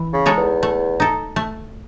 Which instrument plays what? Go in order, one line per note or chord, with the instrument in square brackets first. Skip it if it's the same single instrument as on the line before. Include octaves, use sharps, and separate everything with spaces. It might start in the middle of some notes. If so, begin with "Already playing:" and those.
Already playing: [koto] E3
[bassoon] C#3
[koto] G#3 D#4 A4 C#5
[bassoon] E2
[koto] A3
D#4 A4
A3